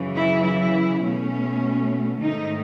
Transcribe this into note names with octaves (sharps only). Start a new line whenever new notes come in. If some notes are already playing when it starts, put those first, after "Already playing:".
Already playing: F#2 C#3 E3
E4
E4
B2 A3 C#4
G#2 D#3 A3 D#4